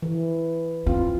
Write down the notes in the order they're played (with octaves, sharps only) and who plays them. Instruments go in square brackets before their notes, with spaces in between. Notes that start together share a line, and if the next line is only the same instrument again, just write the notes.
[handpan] E3
[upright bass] C4 [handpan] F4